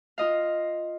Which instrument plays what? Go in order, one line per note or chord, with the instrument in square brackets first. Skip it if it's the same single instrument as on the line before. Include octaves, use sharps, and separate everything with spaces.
[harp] F4 D#5 F5